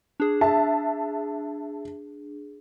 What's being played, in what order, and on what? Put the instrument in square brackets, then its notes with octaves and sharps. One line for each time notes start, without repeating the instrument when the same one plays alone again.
[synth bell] D4 G#4
[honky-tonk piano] E5 A5